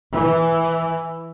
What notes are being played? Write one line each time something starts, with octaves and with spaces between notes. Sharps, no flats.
E3